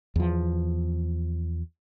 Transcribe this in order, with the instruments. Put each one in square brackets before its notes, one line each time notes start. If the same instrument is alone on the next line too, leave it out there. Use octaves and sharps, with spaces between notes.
[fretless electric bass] E2 F3